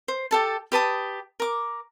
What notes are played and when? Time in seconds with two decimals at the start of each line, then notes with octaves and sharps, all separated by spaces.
0.08 C5
0.31 G4 A4 A5
0.72 G4 B4 A5 D#6
1.40 A#4 D6